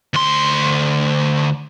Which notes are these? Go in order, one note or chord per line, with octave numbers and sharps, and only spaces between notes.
D2 C6